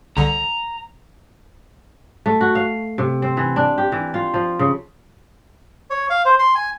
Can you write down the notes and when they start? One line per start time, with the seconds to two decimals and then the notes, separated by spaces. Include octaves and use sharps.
0.17 C2 D3 A#5
2.26 A3
2.41 F#4
2.55 F5
2.98 C3
3.22 C4
3.37 E3
3.56 D4
3.78 G4
3.92 E3
4.14 F4
4.34 F3
4.59 C#3
5.90 C#5
6.10 F5
6.25 C5
6.39 C6
6.55 G#5